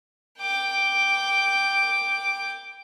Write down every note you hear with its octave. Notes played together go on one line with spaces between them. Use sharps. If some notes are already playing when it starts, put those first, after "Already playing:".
G5 D6